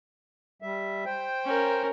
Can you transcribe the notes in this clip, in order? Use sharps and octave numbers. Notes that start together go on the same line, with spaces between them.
G3 E5
C5 G5
C#4 A#4